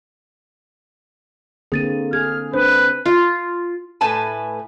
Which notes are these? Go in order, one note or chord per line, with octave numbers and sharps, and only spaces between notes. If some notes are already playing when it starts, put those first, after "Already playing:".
D3 A#3 C4 G#4 A6 D#7
G#4 F6 G#6
C4 D4 B4 C5
F4
A2 B4 G#5 A5